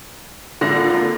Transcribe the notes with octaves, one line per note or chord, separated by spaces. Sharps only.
G#1 D3 A#3 F4 A#6